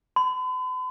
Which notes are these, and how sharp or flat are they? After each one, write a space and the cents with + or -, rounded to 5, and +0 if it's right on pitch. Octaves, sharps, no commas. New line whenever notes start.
B5 +45